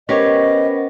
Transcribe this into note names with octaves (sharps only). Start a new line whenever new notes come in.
B3 C#4 G4 A#4 C5 C#5 D#5